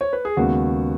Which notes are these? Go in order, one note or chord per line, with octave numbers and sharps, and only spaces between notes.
C#5
B4
G#4
D#2 C#3 G#3 B3 F#4